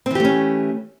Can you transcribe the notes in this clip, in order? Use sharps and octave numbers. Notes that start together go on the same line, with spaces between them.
E3 A3 C4 C#4 G4